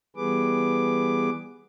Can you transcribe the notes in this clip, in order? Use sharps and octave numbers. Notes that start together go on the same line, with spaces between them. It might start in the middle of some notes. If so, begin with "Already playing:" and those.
E3 G3 B3 G#4 B4 D6